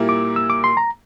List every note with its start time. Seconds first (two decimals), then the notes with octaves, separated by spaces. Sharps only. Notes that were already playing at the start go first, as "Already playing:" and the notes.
Already playing: A#2 G3 A#3 E4
0.09 D6
0.36 E6
0.50 D6
0.64 C6
0.77 A#5